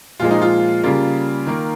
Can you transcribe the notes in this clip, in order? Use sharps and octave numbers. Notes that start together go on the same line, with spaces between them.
A#2 F3 G#3 F4
D#4
F4
C#3 G3 A#3 F4
D#3 A#3